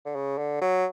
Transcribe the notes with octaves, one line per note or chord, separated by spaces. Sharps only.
D3
C#3
D3
F#3